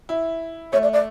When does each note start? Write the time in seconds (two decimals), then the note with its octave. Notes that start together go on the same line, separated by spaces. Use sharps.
0.09 E4
0.73 A3 C#5
0.83 D5
0.93 D5